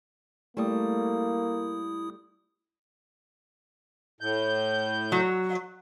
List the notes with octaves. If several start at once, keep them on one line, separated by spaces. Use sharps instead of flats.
G3 A3 A#3 E4 D#6
A2 G6
F#3